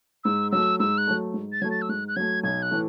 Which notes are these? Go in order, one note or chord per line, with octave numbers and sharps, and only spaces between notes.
G#2 E6
F#3 A3 E6
G#2 E6
F#6
F#3 A3
G#2
A6
F#3 A3 G#6
A6
E6
G#2 F#6
F#6
F#3 A3 G#6
B1 G#6
F#6
A2 E3 A3